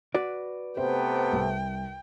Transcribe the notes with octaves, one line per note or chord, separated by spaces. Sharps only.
F#4 B4 D5
C3 A3 B3 C5 G5
C2